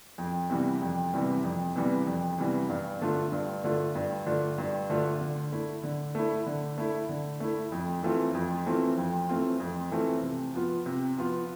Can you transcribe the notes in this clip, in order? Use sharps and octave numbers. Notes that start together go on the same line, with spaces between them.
F2
C3 E3 G3 B3
F2
C3 E3 G3 B3
F2
C3 E3 G3 B3
F2
C3 E3 G3 B3
G2
D3 A3 D4 F4
G2
D3 A3 D4 F4
G2
D3 A3 D4 F4
G2
D3 A3 D4 F4
D3
A3 E4
D3
A3 E4
D3
A3 E4
D3
A3 E4
F2
E3 A3 C4 F4
F2
E3 A3 C4 F4
F2
E3 A3 C4 F4
F2
E3 A3 C4 F4
C3
F3 B3 F4
C3
F3 B3 F4